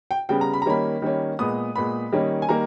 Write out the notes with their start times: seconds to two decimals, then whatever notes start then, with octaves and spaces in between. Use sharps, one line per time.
0.11 G5
0.29 C#3 G3 B3 G5
0.41 A#5
0.54 B5
0.62 A#5
0.66 D#3 G3 A#3 C#4 B5
1.02 D#3 G3 A#3 C#4
1.39 A#2 G#3 B3 D#6
1.76 A#2 G#3 B3 B5
2.12 D#3 G3 A#3 C#4
2.42 G#5
2.49 D#3 G3 A#3 A#5